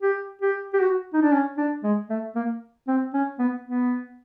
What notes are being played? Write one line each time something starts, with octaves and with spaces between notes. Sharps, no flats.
G4
G4
G4
F#4
D#4
D4
C#4
D4
G#3
A3
A#3
C4
C#4
B3
B3